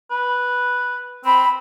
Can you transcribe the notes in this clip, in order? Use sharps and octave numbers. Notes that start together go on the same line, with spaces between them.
B4
C4 B5